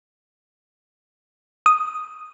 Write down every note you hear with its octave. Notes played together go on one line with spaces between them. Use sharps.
D#6